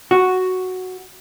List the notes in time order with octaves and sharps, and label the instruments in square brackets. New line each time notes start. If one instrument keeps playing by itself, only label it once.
[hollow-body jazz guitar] F#4